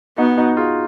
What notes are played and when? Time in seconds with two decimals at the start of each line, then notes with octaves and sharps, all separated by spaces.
0.18 B3 D#4 F#4
0.38 D#4 F#4
0.57 F4 G#4